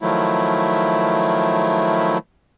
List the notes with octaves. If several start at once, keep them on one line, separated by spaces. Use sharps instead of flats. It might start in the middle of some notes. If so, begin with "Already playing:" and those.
D#3 F3 F#3 A3 E4